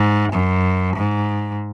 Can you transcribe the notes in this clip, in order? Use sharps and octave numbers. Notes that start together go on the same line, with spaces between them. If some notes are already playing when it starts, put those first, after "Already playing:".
Already playing: G#2
F#2
G#2